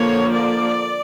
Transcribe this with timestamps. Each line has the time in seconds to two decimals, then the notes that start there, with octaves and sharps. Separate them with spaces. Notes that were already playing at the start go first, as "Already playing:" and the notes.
Already playing: D3 F3 A#3 C#5
0.34 D5